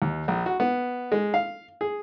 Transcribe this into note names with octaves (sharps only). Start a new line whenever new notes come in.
D#2
A#1
F#4
B3
G#3
F5
G#4